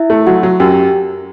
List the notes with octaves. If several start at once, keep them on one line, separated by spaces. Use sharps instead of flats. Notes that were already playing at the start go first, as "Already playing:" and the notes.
Already playing: E4 E5
A3
F#3 F#4 F#5
F#3
F#2 G4 G5